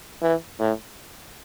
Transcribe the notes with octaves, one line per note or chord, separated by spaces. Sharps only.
E3
A2